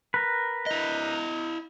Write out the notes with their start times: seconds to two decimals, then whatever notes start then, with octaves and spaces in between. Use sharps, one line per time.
0.14 A#4 B4
0.66 E4 D#5